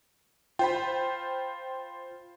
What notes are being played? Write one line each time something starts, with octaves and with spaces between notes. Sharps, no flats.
F4 C5 G5 B5